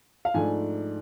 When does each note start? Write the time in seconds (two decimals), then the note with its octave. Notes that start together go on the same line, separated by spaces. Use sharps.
0.25 F5
0.34 G#2 F3 A3 D4 G#5